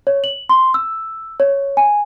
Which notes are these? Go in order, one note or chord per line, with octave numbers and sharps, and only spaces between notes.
C#5
F#7
C6
E6
C#5
G#5